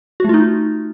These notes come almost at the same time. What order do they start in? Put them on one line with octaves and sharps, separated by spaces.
F#4 A3 F4 D#4